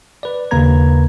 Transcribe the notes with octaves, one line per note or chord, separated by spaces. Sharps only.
B4 D5
D#2 C#3 A#3 B4 A#5 G#6